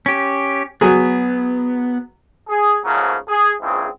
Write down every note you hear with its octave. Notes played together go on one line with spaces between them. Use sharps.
C#4 G4
F#3 B3 G#4
G#4
G#2 C#3 F3 F#3 A3 A#3
G#4
A#1 G#2 C#3 E3 C4 G#4